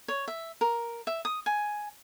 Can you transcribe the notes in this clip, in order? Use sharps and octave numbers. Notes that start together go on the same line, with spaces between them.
C#5
E5
A#4
E5
D#6
G#5